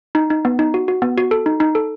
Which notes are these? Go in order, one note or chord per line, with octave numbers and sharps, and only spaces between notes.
D#4
D#4
B3
D#4
F#4
F#4
B3
F#4
A4
D#4
D#4
A4